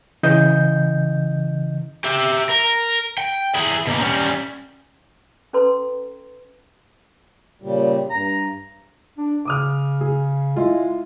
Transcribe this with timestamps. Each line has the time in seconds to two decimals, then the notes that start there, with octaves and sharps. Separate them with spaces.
0.23 C#3 E3 D#5 G6
2.04 G4 E5
2.49 A#4
3.18 G5
3.55 E4 G#4
3.87 B2 A#3
4.00 G3 C#4
5.53 C#4 A4 B4 A#5 C6
7.62 A#2 C#3 G3
8.10 G2 A#5
9.18 D4
9.45 C#3 D6 D#6 F6
10.01 G#4
10.56 G#3 E4 F4